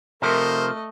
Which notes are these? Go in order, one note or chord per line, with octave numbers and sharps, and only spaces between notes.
C3 F3 A3 A#4 C5 D#5 A#5